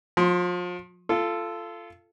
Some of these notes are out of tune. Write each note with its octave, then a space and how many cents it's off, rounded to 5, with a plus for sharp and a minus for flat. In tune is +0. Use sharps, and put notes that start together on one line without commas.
F3 +35 C6 +0
F4 -20 A4 +0